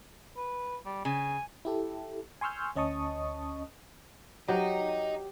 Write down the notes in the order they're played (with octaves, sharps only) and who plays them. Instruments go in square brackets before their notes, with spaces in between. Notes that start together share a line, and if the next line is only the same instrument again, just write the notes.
[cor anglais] B4
G3
[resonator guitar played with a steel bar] C#3 [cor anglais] G#5
[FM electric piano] E4 G4 A4
G#5 C6 C#6 E6 F6 G6
D2 C#4 D#5 A5 C#6 D#6
[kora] F#3 [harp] G4 [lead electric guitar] D#5 A#5